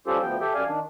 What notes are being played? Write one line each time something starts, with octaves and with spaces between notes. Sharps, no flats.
G3 C#4 F4 G4 A4 C5
D2 F3 B3 G5
G4 A4 E5 G5
F#2 D5 F5 G#5
D#3 D4